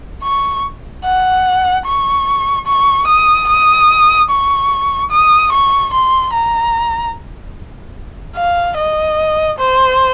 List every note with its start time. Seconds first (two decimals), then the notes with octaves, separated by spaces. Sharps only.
0.23 C#6
1.04 F#5
1.86 C#6
2.67 C#6
3.07 D#6
3.49 D#6
4.31 C#6
5.11 D#6
5.52 C#6
5.93 C6
6.33 A#5
8.37 F5
8.77 D#5
9.59 C5